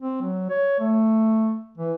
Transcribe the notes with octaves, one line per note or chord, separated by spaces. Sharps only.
C4
F#3
C#5
A3
E3